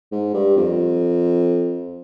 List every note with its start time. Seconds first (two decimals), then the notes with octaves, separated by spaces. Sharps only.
0.12 G#2
0.34 G2
0.57 F2